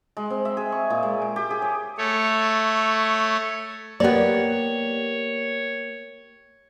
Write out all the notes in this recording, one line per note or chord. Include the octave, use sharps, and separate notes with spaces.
G#3
C4
E5
G#4
C#6
A#2
G#3
G5
G4
G#4
C#5
A3 C#5
A#3 B3 G4 C#5 D5